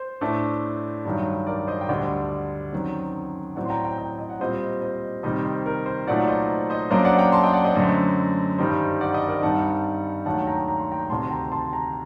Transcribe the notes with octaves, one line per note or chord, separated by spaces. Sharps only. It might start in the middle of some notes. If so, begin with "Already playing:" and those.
Already playing: C5
A2 A3 D4
G2 D#3 F#3
A#4 D5
C5 D#5
G5
D2 D3 G3 D5 F#5
F#2 D#3 F#3 C4
A2 F#3 C4 D5 F#5
C6
G5 A#5
G5 A#5
D#5 G5
D#5
F#5
A#2 G3 C4 C5 D#5
C5 D#5
C3 D#3 G3 C5 D#5
C5
A#4
C5
A#2 F#3 A3 D#4 D5 F#5
C5 D#5
C5 D#5
F#2 F#3 A#3 D4 C5 D#5
D5 F#5
G5 A#5
A5 C6
D#5 G5
D5 F#5
C5 D#5
F#2 D3 A3
G2 D#3 G3 C5 D#5
D5 F#5
C5 D#5
A#4 D5
G2 D#3 G3 C4 D#4 F#5 A5
D#2 D#3 F#3 A3 D4 F#5 A5
G5 A#5
A#5
C6
G5 A#5
D2 C3 D#3 A5 C6
G5 A#5
A5 C6
G5 A#5